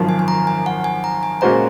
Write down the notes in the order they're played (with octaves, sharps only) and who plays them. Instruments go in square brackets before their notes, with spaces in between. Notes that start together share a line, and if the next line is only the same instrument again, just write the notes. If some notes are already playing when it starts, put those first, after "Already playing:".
Already playing: [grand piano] G#1 F#2 F3
[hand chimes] G#5
G#5
A#5
G#5
F#5
G#5
A#5
G#5
[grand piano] A#2 G#3 C#4 F#4 C5 [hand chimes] A#5